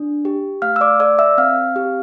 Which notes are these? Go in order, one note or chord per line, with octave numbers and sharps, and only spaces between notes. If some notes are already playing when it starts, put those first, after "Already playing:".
Already playing: D4
G4
A3 F5 F6
E6
D5 D6
A4 D5 D6
E5 E6
C4 F5 F6
G4